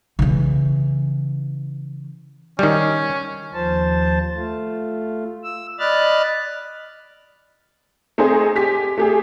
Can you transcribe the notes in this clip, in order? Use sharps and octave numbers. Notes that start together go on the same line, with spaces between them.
C#3 E3
D#3 G3 C#4
D#2 F3 C5 A5
A3 F4
E6
D5 D#5 B5 F6 F#6 A6
A3 C4 D#4 G#4 C5
G4 G#5 B6
A3 G4 G#4